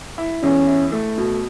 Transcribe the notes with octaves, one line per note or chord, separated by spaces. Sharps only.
E4
E2 C#4
E4
A3
B2